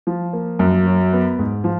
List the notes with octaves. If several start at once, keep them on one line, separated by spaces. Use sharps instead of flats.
F3
A#3
F#2
F#3
B3
G#2
F3